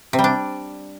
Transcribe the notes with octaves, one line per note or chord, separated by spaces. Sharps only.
C3
G3
D4